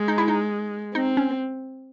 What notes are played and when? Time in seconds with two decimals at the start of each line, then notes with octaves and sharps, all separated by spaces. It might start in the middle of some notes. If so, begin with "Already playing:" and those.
Already playing: G#3
0.08 D#4
0.18 E4
0.28 D#4
0.95 C4 D#4
1.17 C#4